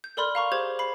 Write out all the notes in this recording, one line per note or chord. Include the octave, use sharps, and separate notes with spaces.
G6
A4 A#4 D5 B5 C6 F6
F5 A#5 C#6
G4 G#4 C5 G6 G#6 F7
B5 C7